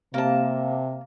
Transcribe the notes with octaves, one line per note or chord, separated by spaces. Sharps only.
C3 A#3 A5